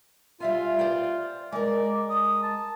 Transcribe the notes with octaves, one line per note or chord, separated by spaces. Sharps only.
G3 F4 E5 G#5
C5 D5 G5
G#3 A#4 D5
D#6
A5